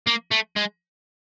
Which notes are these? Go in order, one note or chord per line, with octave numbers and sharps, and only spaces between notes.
A#3
A3
G#3